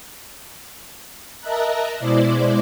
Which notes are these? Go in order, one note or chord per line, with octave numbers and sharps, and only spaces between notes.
A#4 D#5 E5 A5 A#5 F#6
B2 G#3 E4 C5 D5 D6